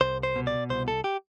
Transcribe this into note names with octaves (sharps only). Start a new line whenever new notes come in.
C2 C5
C5
B2
D5
C2 C5
A4
G4